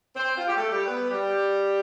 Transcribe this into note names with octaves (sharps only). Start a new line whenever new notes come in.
C4 C5
F4
G4
A3 A4
G3 G4
B3 B4
G3 G4